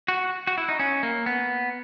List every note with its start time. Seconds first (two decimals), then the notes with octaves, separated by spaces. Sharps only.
0.08 F#4
0.47 F#4
0.58 E4
0.69 D#4
0.80 C#4
1.03 A#3
1.26 B3